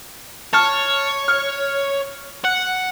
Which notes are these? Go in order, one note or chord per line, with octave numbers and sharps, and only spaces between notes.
C#5 A5 F6
F6
F#5